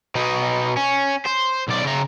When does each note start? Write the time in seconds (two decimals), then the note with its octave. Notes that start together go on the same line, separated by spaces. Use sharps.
0.15 B2 D#4
0.77 C#4
1.26 C5
1.68 B1 D5
1.84 C#3 A#5